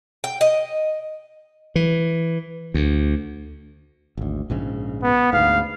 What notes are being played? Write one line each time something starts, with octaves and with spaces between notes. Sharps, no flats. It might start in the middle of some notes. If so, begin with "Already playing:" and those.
G5
D#5
E3
D2
G#1 D2
A#1 G#2 C#3
B3
D2 G#2 F5